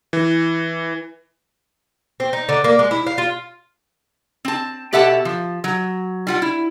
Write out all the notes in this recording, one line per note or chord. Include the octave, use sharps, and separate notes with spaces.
E3
C4
D#4
D3
A#3
G#3
E4
F5
F4
C4 A5
B2 G4 A4 E5 F#5 A5
F3
F#3
G3 F4 F#5
E4